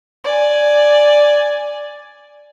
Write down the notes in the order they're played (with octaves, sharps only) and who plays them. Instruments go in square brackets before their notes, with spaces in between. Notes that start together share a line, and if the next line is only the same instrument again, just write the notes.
[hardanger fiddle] D5 G#5